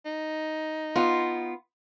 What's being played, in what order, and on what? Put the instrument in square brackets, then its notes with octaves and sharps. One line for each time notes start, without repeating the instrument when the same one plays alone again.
[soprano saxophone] D#4
[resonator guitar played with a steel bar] B3 F4